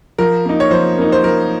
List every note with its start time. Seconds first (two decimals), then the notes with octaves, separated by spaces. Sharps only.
0.18 F3 A#4
0.45 A#3 D#4
0.60 C#5
0.71 F3 C5
0.98 A#3 D#4
1.12 C5
1.24 F3 A#4